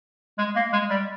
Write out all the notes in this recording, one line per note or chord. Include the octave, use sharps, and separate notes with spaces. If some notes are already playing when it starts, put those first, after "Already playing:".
G#3
A#3
G#3
G3